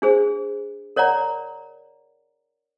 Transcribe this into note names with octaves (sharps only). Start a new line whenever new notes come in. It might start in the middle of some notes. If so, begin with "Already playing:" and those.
D4 G#4 C5
A#4 C#5 D5 F#5 A#5